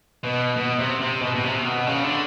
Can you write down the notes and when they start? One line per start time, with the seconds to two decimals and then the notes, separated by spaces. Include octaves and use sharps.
0.24 B2
0.57 B2
0.79 C3
1.00 C3
1.22 B2
1.35 B2
1.44 C3
1.65 B2
1.87 C#3
2.04 D3